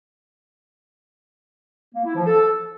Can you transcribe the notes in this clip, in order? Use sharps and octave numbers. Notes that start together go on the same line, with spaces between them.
A#3
E4
F3
A4